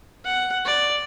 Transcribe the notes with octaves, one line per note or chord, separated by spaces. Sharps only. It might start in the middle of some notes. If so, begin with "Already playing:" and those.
F#5
D5